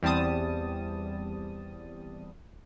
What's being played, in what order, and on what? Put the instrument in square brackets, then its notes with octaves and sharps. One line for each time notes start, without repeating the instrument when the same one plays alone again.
[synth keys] E2 G3 C4 A5 D#6